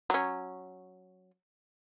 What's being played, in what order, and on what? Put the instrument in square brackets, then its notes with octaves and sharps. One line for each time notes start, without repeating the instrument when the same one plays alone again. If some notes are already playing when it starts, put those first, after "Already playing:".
[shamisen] F#3 C#4